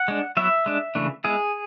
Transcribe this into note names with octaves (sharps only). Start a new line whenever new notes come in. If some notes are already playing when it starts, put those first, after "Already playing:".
Already playing: F#5
G#3 D4
F#3 B3 E4 E5
G#3 D4
C#3 E3 A3 D4
G#3 B3 E4 G#4